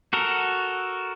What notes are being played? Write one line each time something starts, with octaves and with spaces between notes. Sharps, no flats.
F#4 A4 A#4